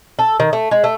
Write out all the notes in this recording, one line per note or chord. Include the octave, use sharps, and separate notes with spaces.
A4
D#3
A3
G#3
A3